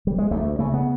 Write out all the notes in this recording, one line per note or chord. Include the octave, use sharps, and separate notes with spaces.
G3
G#3
D2 A3
C#3 A3
B3